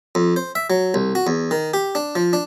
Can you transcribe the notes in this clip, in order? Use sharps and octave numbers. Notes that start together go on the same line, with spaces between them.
F2
C5
E5
F#3
C2
F#4
E2
D#3
G4
D4
F3
D4